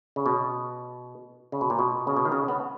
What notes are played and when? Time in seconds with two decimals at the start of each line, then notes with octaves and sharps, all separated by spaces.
0.16 C#3
0.26 B2
1.52 C#3
1.61 B2
1.70 A#2
1.79 B2
2.07 C#3
2.17 B2
2.25 D#3
2.32 C#3
2.48 B3